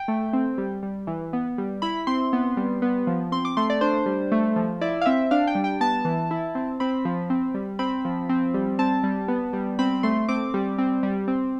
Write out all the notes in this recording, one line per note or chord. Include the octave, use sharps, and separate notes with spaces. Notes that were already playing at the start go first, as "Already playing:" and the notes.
Already playing: G5
A3
C4
G3
G3
E3
B3
G3
E4 B5
C4 C6
B3
G3
B3
F3
C4 C6
D6
A3 C6
D5
D4 C5
G3
A3
F3
E4 D5
F5
C4 E5
D4 F5
G5
G3
G5
B3 A5
E3
E4
C4
C4 B5
F3
C4
G3
C4 B5
F3
C4
G3
C4 A5
G3
B3
G3
C4 B5
A3 C6
C4 D6
G3
C4
G3
C4